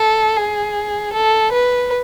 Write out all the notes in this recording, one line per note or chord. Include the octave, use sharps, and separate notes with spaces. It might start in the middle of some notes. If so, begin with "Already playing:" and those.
Already playing: A4
G#4
A4
B4